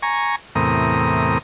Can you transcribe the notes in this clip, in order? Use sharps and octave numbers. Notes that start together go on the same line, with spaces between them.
G#5 A#5 C#6
E2 A2 C3 A#4 D#6